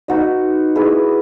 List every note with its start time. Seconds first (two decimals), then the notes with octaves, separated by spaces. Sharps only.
0.08 D#4 F#4 B4 D#5
0.76 E4 G#4 B4